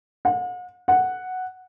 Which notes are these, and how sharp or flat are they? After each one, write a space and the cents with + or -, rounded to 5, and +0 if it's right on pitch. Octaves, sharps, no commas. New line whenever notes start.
F#5 -40
F#5 +0